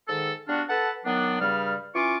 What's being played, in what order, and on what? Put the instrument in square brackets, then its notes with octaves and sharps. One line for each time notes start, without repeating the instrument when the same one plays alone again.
[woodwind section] G#2 D#3 A4
G3 B3 D4 F4 F#4
A4 B4 F#5 A5
D#3 F#3 B3 D4
G2 C#3 G3 F6
E3 C#4 F4 C#6 D6